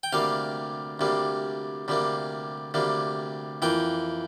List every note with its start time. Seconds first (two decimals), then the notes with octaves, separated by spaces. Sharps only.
0.03 G5
0.12 D2 C3 G3 A#3 F5
0.99 D2 C3 G3 A#3
1.88 D2 C3 G3 A#3
2.74 D2 C3 G3 A#3
3.62 F2 E3 A#3 G5